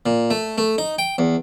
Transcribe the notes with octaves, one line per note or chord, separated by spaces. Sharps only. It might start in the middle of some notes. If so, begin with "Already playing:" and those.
A#2
A3
A3
D#4
G5
E2